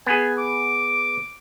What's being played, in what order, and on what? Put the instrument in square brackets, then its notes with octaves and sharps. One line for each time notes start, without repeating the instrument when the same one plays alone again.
[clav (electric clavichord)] B3 G#4 [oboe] G#5
[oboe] D6